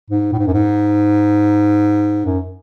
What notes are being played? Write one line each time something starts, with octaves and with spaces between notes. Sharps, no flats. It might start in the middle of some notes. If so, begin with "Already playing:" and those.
G#2
A2
G#2
F#2
G#2
F#2